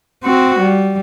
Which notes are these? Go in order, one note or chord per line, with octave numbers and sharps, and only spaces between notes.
C4 F#4
G3